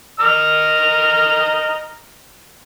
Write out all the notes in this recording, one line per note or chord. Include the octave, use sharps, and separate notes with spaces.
D#5 A#5 F6